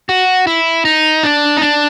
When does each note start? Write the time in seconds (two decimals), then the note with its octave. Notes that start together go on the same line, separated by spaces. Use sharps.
0.09 F#4
0.47 E4
0.85 D#4
1.23 D4
1.57 D#4
1.61 D4